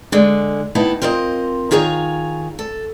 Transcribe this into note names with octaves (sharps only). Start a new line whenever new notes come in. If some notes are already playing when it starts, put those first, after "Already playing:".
D3 G#3
D#2 B3 D#4 E4 A5
C4 F4 A#4 C5 D#5
D#3 F4 G#4 C#5 A#5
A4